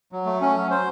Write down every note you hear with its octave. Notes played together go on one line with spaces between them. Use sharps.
F#3
A3
C#4
F#3
C5